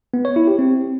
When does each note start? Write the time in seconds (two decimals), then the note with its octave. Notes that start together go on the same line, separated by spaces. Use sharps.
0.14 B3
0.25 C#5
0.36 E4
0.47 G4
0.59 C4